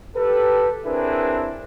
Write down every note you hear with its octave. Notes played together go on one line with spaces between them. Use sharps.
G4 A4 B4
C4 D4 E4 G#4 A#4 B4